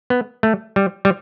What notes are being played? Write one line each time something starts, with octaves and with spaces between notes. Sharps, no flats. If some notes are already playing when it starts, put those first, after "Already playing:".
B3
A3
G3
G3